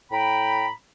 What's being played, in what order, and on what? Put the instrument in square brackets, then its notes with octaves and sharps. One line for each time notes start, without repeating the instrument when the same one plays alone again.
[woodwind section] A2 A#5 B5 [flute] G5